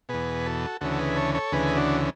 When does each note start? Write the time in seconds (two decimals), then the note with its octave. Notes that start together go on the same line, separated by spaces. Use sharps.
0.09 E2 B2 G#4 B4
0.46 F#4 A4
0.81 D2 C#3 E3 F#4 A4
0.92 A4
0.99 G#4 B4
1.17 A4 C#5
1.35 A4 C#5
1.52 D2 C#3 E3 G#4 B4
1.76 D4 F#4